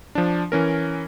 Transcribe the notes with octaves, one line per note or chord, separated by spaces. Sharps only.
F3 D4
E3 C#4 A#4